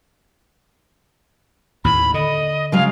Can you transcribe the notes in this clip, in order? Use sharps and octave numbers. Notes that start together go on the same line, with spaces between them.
D#2 A2 B5
D3 D#5
C#3 F#3 G#3 F5